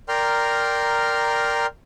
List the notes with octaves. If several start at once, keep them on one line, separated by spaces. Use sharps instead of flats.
A#4 D5 G5 A#5 C6 F6